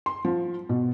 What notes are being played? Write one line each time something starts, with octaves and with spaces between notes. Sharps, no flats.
C6
F3
B2